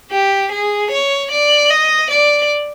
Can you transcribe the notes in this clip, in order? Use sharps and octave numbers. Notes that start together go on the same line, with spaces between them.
G4
G#4
C#5
D5
D#5
D5